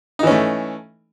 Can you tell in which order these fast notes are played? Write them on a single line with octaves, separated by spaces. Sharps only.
D#4 E3 C#4 A3